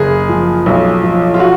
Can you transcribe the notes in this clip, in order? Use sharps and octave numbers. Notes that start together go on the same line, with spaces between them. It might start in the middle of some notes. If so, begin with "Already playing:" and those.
Already playing: F#1 G#4
F3
B1
F3
F4
F#4